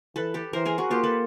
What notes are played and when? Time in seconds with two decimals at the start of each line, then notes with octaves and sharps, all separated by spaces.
0.16 E3 A4 B4
0.34 G4 A4
0.53 E3 A#4 C5
0.65 G#4 A#4
0.78 F#4 G#4
0.91 A#3 F4 G4
1.03 A4 B4